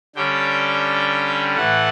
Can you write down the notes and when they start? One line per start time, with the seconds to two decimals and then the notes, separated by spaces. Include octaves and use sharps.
0.16 D3 G3 C#4 G5
1.56 A2 E3 A3 F#5